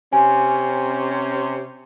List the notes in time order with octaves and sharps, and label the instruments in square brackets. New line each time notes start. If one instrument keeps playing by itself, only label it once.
[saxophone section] C3 C#4 [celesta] G#5